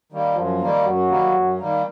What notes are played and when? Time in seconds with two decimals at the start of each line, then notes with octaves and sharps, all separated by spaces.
0.12 D#3 G3 A#3
0.36 F#2 F3
0.61 D#3 G3 A#3
0.85 F#2 F#3
1.10 D#3 G3 A#3
1.34 F#2
1.58 D#3 G3 A#3